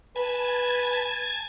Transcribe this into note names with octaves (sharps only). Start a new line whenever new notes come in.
B4 G#5 A5 G#6